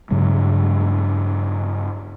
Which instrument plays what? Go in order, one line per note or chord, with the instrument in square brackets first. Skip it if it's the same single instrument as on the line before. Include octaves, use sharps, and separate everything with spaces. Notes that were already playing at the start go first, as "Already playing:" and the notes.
[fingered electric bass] G2 C#3 F#3 G#3